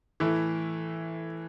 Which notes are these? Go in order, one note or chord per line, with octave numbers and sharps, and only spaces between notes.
A2 E3 A3 E4